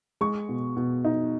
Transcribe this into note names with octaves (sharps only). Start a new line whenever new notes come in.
G#3 C#6
B2
B2
D#4